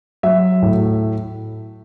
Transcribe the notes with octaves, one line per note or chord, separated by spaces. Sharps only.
F#3 E5
A2